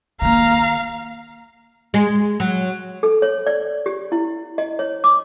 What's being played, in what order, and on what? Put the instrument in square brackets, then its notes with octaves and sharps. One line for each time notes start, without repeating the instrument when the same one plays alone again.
[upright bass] D#3 A#3 [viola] F5 [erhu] A#5
[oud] G#3
F#3
[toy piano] A4
C#5
D5
G4
E4
D#5
C#5
D6